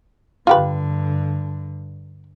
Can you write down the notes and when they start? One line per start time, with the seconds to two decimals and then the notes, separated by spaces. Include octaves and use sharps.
0.47 G2 D3 F4 G4 B4